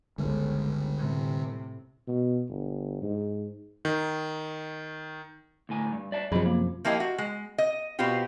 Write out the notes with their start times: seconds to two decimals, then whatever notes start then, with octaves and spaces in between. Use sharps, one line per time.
0.18 G1 C#2 D3 G3
0.96 A2 C3
2.08 B2
2.49 G1
3.02 G#2
3.85 D#3
5.69 D2 A2 G#5
5.92 G2
6.12 D5 E5 A5
6.32 F#2 C3 F3 G#4 D#5 B5
6.46 A#3
6.85 F3 A#3 E4 G4 A#4 D#5
7.00 F#4
7.18 G#3
7.58 D#5
7.99 B2 B3 C4 F4 G4